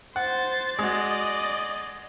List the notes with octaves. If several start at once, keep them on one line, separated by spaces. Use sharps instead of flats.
C5 F#5 A6
G#3 F#4 D5 D#5